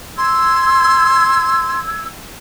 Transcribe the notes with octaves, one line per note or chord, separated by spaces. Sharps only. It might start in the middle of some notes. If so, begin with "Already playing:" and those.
C6 E6 G#6